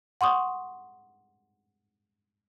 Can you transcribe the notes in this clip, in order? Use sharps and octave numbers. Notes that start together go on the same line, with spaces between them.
F#5 C6 C#6 D#6